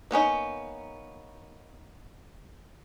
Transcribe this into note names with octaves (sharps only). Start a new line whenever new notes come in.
A#3 B3 C#4 D#4